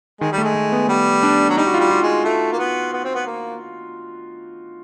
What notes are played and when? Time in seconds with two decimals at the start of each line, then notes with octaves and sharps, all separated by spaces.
0.21 D#3 G#3
0.32 G3
0.38 A3
0.44 G#3
0.55 A3
0.72 B3
0.89 G3 B3
1.23 D4
1.50 F#3
1.57 G3 D#4
1.67 F#4
1.74 F4
1.80 G3
1.91 F4
2.03 G#3
2.25 A3
2.53 A#3
2.59 B3
2.93 B3
3.04 C4
3.15 B3
3.26 A#3